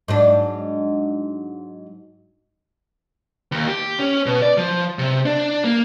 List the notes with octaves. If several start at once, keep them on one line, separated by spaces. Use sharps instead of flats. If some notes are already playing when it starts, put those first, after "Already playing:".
G#2 F#3 D4
D#2
G4
C#4
B2
D5
F3
C3
D4
A#3